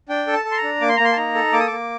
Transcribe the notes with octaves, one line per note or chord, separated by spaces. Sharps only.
D4 G5
A4
A5
A4
C6
A#5
D4
A#3 D6
C6
A#3 A#5
C6
A5
D#4 A#5
A4
A#3 D6
D#6
A#3 D6